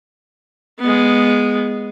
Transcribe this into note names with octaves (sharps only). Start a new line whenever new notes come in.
G#3 B3